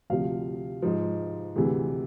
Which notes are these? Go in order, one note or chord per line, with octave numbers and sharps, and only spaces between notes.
D2 C3 F3 F5
G#2 F3
D2 C3 E3 G#4